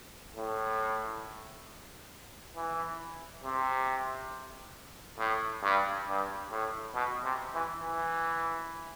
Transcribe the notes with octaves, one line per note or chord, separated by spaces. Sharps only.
A2
E3
C3
A2
G2
G2
A2
B2
C3
E3
E3